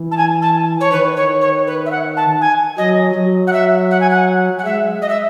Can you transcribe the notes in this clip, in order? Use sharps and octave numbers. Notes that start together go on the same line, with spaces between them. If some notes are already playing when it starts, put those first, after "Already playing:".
Already playing: E3
A5
G#5
A5
C#5
D#3 B4
C#5
C#5
B4
E5
F#5
A5
G#5
F#3 D#5
F#3
F#5
E5
F#5
G#5
F#5
F#5
G#3 E5
D#5
E5